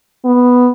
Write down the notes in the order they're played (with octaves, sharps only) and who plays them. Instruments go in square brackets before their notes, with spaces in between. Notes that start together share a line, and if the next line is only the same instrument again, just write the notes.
[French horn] B3